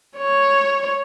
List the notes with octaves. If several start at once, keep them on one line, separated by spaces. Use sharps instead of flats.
C#5